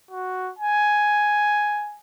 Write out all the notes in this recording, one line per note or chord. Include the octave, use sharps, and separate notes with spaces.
F#4
G#5